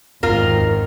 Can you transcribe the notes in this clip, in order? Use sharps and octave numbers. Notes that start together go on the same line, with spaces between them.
G#1 E2 D#3 F4 A#4